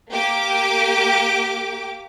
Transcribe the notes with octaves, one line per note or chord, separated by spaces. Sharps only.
A#3 G4 D6